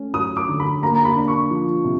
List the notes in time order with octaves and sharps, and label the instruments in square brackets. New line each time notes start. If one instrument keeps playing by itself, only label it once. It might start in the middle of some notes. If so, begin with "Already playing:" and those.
Already playing: [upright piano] A3 C#4
[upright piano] F#3 [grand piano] D#6
[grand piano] D6
[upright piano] D3
[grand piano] B5
[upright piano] A#3 [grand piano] A#5
[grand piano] B5
[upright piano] D4
[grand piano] C#6
[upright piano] F3
C3